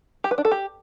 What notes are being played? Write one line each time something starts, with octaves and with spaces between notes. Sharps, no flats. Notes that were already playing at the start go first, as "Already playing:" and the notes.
G4
B4
D4
A4
G4